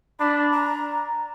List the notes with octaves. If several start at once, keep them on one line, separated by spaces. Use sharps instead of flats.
D4 B5
A#5